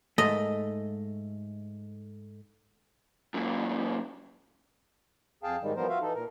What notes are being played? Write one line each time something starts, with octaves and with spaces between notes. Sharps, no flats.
G#2 A3 D#5
F#2 A#2
F2 G#4 F5 G5 A5
G#2 D#3 G3 G#3
E3 F3 G3 B3 A#4 C5
F4 F#4 E5 F5
E3 D#4 A4
A#2 A#4